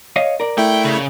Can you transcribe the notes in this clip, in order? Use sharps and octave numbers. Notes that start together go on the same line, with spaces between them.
C#5 D#5 F5
A#4 D5
A3 E4 G5
C#3